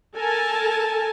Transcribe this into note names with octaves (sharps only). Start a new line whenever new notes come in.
A4 A#4 G#5 A5